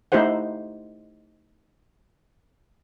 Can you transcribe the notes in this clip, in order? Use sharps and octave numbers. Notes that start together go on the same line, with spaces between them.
A3 D#4 E4 G4 C5 F#5